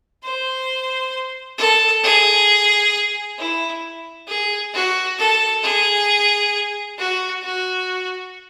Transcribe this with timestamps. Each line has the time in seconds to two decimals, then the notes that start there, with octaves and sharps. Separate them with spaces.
0.23 C5
1.58 A4
2.03 G#4
3.39 E4
4.28 G#4
4.74 F#4
5.18 A4
5.63 G#4
6.98 F#4
7.44 F#4